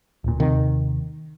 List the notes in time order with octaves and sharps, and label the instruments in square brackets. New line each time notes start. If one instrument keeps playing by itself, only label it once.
[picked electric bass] D1 A#2
[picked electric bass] D#2 C3 [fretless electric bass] D#3